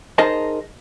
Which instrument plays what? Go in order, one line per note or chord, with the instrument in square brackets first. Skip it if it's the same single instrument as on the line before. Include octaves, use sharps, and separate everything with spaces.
[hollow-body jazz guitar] D#4 G#4 A#4 C5 D#5 A5